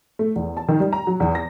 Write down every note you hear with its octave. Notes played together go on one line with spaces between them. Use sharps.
A3
E2
A5
D#3
G3
A#5
F#3
E2
A#6